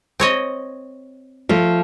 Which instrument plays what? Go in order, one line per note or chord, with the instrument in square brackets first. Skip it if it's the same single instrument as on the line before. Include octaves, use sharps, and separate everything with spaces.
[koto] C4 C#5 D#5
[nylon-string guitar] F3 A3